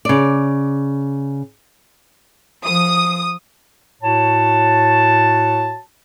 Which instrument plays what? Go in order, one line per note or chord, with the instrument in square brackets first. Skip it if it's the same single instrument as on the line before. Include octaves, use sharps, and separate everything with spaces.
[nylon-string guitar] C#3 D5
[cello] F3 [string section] D#6
[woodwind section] A2 F#4 C#5 A5